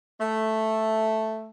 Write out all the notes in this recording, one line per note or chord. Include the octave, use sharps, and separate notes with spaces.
A3